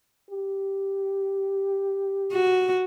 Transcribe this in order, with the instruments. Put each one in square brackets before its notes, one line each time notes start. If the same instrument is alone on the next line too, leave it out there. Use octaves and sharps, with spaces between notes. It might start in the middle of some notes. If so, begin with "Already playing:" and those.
[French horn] G4
[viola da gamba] F#4